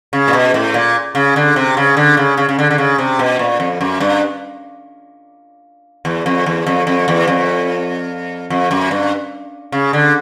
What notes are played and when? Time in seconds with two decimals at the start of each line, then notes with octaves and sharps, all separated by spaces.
0.13 C#3
0.28 A#2
0.33 B2
0.54 A2
0.74 A#2
1.15 C#3
1.36 D3
1.56 C3
1.77 C#3
1.97 D3
2.17 C#3
2.37 C#3
2.49 C#3
2.59 D3
2.71 D3
2.78 C#3
2.98 C3
3.19 B2
3.39 A#2
3.60 F2
3.81 F#2
4.00 G2
6.05 E2
6.26 F2
6.46 E2
6.66 F2
6.87 F2
7.08 E2
7.27 F2
8.50 F2
8.71 F#2
8.91 G2
9.72 C#3
9.93 D3